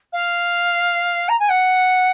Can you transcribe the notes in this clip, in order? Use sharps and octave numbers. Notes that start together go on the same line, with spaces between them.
F5
A#5
G#5
F#5